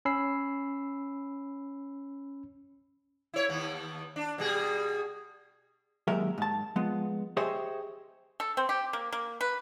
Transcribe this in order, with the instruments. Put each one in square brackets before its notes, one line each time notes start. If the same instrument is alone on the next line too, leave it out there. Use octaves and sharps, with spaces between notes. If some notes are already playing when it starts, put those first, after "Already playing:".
[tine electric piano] C#4 B5 E6 C7
[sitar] E4 C#5
D#2 B3
D4
B2 G3 G#4
[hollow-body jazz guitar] D#2 F#3 G#3 A#4 E5
G#2 A5
F3 G#3 B3
G4 G#4 C5 C#5 D#5 E5
[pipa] A4
C4
G4
A#3
A#3
B4